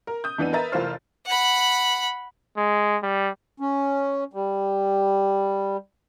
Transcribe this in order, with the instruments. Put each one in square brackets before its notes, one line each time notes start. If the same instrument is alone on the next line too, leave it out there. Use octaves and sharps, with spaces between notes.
[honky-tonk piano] A#4
D#6 G6
F2 E3 B3 D4 D#7
A#4 B4 D#5 E5 A#5 A6
F1 E3 F4 A#4 C5 F6
[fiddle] F#5 B5
[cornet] G#3
G3
[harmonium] C#4
G3